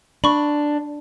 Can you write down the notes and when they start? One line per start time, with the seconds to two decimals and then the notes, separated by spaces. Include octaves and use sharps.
0.24 D4 B5 C#6